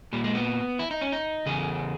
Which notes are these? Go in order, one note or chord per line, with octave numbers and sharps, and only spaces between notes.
A#2 G3
G#3
B3
E4
D#4
C#4
D#4
E2 C#3 G#4